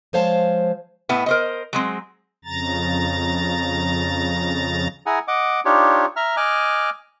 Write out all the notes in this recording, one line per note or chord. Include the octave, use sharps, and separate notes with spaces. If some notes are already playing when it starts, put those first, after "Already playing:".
F3 G#3 C5 C#5 F5 A5
A2 B3 E4
A#4 C5 D#5
F#3 G#3 C4
F2 C#3 A#5 A6
E4 G#4 F#5 G#5 A#5
D#5 F#5 D6
D4 D#4 F4 G4 C#5
E5 A#5 F6
D#5 G#5 D6 F6 F#6